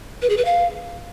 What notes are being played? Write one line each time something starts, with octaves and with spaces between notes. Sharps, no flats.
B4
G#4
B4
F5